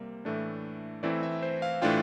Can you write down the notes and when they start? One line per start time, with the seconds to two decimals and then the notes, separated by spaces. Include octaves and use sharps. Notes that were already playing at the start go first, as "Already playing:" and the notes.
Already playing: C3 G3 A#3
0.25 A2 E3 A3 D4
1.03 E3 A3 C4 E4 D5
1.23 E5
1.43 C5
1.62 F5
1.82 A2 E3 A3 D4 F4 G5